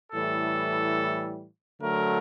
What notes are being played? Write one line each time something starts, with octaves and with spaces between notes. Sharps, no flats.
A2 E3 G3 A4
D3 F#3 A3 A#4